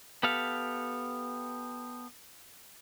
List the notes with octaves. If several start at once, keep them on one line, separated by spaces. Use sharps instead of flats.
B3 G4 A4 F5